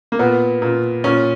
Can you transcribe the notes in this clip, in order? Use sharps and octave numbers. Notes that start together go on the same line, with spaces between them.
A#3
A#2 B3
A#2
A#2 C#4